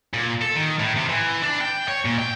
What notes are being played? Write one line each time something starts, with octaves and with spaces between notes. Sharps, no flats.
A#2
A4
D#3
A2
C3
E3
D4
G5
C#5
A#2
G5